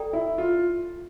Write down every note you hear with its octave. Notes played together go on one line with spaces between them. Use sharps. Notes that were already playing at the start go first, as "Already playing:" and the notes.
Already playing: A4 D5 G5 A#5
E4
F4